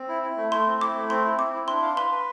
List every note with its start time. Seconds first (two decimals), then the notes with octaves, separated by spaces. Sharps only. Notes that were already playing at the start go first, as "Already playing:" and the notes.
Already playing: C4
0.08 E4
0.23 E4
0.37 A3
0.52 A3 C6
0.67 C4
0.81 E4 D6
0.95 A3
1.10 C4 C6
1.25 E4
1.39 C4 D6
1.53 E4
1.68 D4 C6
1.82 F5
1.96 B4 C6
2.11 B4